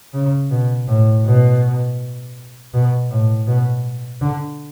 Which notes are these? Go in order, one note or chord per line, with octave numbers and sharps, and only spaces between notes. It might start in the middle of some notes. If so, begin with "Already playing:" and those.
C#3
B2
A2
B2
B2
A2
B2
D3